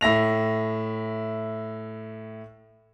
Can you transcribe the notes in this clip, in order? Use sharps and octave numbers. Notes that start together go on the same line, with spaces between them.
A2 E5 A#6 F7